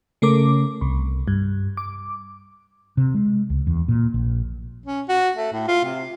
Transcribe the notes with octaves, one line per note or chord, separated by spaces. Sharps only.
C#3 A3 A#4 D6
C2
G2
D6
C3
G#3
C#2
E2
A#2
A#1
C#4
F#4
A3
A2
F4
C3